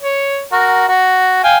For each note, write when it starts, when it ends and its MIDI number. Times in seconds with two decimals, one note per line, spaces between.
0.02 0.43 73
0.52 0.85 66
0.52 0.85 70
0.88 1.41 66
1.44 1.57 77
1.44 1.57 79
1.44 1.57 80